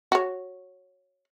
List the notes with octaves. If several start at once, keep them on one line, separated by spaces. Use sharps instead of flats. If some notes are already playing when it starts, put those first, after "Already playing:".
F#4 C#5